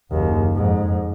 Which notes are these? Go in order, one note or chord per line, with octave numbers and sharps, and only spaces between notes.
F#1 D#2
F2 G#2